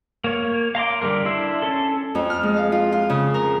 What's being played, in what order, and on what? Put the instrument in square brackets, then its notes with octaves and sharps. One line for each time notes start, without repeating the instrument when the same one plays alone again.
[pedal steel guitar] A#3 C#5
F5 A#5 C6 D6
D3 G3 A3 A#4
D4 E4 E5 C6
C#4 A4
[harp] F2
F6
G#3
F5
F4
F4
C#3
A#4